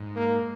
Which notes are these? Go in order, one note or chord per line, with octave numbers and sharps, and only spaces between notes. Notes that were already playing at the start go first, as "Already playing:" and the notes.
Already playing: G#2
A#3